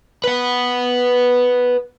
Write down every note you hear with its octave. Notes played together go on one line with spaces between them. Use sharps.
B4 F#5